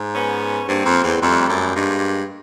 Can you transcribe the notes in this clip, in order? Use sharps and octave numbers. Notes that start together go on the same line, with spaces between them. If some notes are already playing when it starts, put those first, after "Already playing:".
Already playing: G#2
B3 C#4
G2 A#3 C4
F2
E2
F2 G3 A3
F#2
G2 G#3 A#3